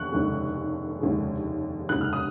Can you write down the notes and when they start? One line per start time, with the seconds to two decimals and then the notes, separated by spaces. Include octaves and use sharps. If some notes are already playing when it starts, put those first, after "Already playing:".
Already playing: F1 D#2 C#6 F#6
0.12 F1 D#2 C#3 G#3
1.01 F1 D#2 C#3 G#3
1.89 F1 D#2 C#3 G#3 F#6
2.01 F6
2.13 D#6